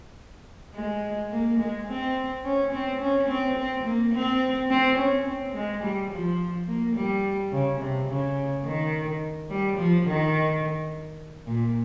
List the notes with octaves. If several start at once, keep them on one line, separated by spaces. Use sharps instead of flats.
G#3
A#3
G#3
C4
C#4
C4
C#4
C4
C4
A#3
C4
C4
C#4
C4
G#3
G3
F3
A#3
G3
C#3
C3
C#3
D#3
G3
F3
D#3
A#2